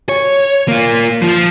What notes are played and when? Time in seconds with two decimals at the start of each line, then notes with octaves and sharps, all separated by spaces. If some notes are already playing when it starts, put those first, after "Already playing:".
0.09 C#5
0.68 A#3 F4
1.22 F3 F4